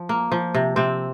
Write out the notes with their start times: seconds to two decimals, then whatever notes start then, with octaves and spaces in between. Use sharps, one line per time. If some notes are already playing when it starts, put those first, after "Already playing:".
Already playing: F3
0.09 A#3
0.32 F3
0.55 C3
0.76 C3 C4